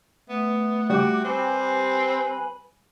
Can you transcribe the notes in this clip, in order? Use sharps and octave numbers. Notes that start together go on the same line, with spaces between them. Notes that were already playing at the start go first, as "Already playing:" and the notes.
A3 B3
G3 F#4 D6
C4 B4 G#5 B5